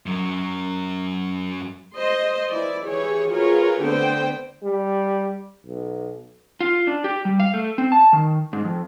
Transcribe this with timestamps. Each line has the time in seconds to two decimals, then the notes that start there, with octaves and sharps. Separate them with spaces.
0.06 F#2 F#3
1.96 C5 D#5 C6
2.51 E3 E4 D5
2.86 E3 G4 G#4 C#5
3.30 F4 F#4 G#4 A#4 B4 C#5
3.83 D3 A3 B3 C4 C5 G5
4.64 G3
5.66 B1
6.61 F4
6.87 D4
7.04 G4
7.25 G3
7.40 F5
7.54 A3
7.78 C4
7.92 A5
8.13 D#3
8.53 G#2
8.65 F2